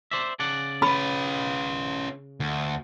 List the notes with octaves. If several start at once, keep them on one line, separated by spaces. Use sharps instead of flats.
C5 D5 E5
C#3 D5 F#5
C#4 B4 B5
D2